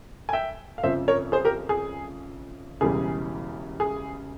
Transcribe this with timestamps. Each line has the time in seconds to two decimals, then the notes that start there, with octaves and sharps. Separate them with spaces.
0.29 G#5
0.33 E5 G5
0.78 F5
0.83 G1 F2 C#3 F3 C5 E5
1.08 A#4 C#5
1.32 G#4 C5
1.45 G4 A#4
1.69 G#4
2.81 E1 E2 C#3 E3 G3 G#4
3.80 G#4